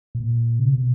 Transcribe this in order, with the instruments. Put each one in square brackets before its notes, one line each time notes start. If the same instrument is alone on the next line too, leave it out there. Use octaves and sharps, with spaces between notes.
[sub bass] A#2
C#3
C3
B2